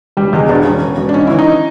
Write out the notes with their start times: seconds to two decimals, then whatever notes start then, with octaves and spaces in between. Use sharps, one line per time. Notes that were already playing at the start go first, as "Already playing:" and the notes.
0.17 E1 G3
0.33 E2 G#3
0.49 E1 D4
0.65 E1 C#4
0.82 E1
0.98 E1
1.09 D4
1.14 G#2 C#4
1.27 E3 E4
1.39 D#4